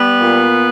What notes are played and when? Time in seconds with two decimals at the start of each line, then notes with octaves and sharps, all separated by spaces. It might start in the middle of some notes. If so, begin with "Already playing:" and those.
Already playing: G3 B3
0.21 A#2